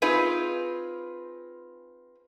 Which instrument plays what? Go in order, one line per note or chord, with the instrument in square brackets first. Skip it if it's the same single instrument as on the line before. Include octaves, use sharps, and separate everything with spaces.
[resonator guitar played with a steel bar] C4 D#4 F4 G#4 B4